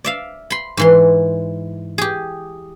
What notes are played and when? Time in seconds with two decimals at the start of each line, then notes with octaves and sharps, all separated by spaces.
0.04 D5 E5 F5
0.50 B5 C6
0.77 G#2 E3 C6
1.98 G4 G#4